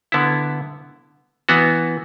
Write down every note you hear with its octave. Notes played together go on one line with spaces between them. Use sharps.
D3 B3 E4
E3 B3 F#4